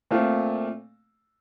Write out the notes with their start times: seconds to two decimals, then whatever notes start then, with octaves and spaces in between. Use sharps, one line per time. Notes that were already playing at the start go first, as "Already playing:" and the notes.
0.11 A#2 A3 C4 F4